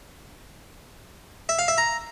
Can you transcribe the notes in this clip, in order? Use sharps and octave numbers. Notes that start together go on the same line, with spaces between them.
E5
F5
E5
A#5